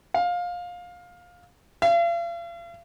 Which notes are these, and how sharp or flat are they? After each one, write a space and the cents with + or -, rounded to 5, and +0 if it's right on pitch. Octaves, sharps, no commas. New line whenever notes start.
F5 +20
F5 -40